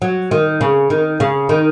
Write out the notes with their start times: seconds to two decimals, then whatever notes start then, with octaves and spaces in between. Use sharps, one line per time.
0.02 F#3
0.31 D#3
0.61 C#3
0.90 D#3
1.20 C#3
1.49 D#3